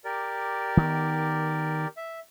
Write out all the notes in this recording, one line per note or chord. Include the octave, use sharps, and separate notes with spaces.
G4 A#4 D5
D#3 B3
E5